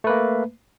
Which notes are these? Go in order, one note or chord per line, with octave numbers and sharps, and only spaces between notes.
A3 A#3 B4